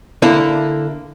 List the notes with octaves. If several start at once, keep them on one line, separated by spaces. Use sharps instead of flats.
D3 A#3 E4